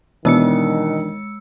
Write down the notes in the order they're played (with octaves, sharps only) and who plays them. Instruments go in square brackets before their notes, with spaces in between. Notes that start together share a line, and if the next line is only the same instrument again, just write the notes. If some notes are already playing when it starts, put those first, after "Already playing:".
[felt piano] B2 [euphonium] D#3 [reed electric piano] E3 D4 [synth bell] G#3 E6 C#7